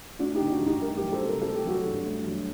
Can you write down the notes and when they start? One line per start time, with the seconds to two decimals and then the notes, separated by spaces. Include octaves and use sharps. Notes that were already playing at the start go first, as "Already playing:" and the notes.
0.19 A3 D4 F#4
0.35 D#4 G4
0.41 D3
0.46 D#4
0.50 D4 F#4
0.61 G2
0.66 D#4 G4
0.81 A3 G4 A#4
0.97 G4 A#4
1.02 F#3
1.12 A4 C5
1.23 C3
1.29 A#4
1.42 A3 A4
1.55 G4
1.65 F#3 F#4 A4
1.86 G2
2.06 A3
2.27 F#3